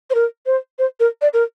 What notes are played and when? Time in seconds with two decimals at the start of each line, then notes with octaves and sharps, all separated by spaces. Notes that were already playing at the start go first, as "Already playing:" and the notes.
0.10 C5
0.15 A#4
0.46 C5
0.79 C5
1.00 A#4
1.22 D5
1.34 A#4